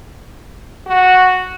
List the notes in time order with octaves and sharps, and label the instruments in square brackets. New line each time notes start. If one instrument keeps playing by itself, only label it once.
[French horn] F#4